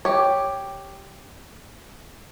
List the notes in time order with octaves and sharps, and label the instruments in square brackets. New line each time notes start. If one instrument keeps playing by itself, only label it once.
[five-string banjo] G4 C#5